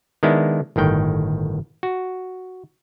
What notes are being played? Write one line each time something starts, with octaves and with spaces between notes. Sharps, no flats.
D#3 G#3 B3 D4 E4
G1 A2 D#3 G5
F#4